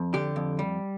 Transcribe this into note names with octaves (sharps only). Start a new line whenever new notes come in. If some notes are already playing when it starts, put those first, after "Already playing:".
Already playing: F2
D3 G4
F2
G3